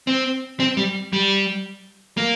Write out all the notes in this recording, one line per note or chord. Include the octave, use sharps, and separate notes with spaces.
C4
C4
G3
G3
A#3